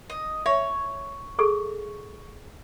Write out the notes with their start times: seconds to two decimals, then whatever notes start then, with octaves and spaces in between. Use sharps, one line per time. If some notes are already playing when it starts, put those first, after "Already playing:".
0.10 D#5
0.46 C#5 E5
1.39 G#4 A4 C#6